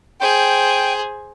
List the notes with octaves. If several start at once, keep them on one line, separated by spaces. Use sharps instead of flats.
G#4 C5 G5